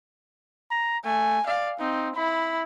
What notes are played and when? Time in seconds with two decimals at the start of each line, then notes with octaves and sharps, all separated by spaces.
0.71 A#5
1.05 A3 G#5
1.47 D5 F5
1.80 C4 D#4
2.16 E4 B5